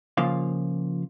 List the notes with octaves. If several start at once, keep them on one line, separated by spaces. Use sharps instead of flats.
C#3 F3 A#3 F4 F5